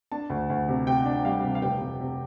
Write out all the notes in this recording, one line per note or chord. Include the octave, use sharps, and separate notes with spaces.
D4 A5
D2
D2
C3
C3 G5
D4
G3 F5
C3
F5
F1 G5
F1
C3